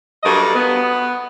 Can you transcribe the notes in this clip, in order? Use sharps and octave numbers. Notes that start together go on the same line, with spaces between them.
G2 F#3 A3 A#3 D5 D#5
B3